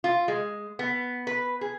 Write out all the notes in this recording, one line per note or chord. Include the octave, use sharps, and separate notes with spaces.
F4
G#3
B3
B4
G#4